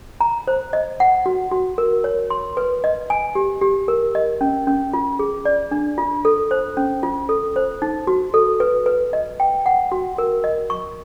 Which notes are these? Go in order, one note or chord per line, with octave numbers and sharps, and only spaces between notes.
A#5
C5
D#5
F#5
F#4
F#4
A#4
C#5
C6
B4
D#5
G#5
G4
G4
A#4
D#5
C#4
C#4
F4
G#4
D5
D4
F4
A4
C5
C#4
F4
A4
C5
D#4
F#4
A4
B4
B4
D#5
G5
F#5
F#4
A#4
D#5
C#6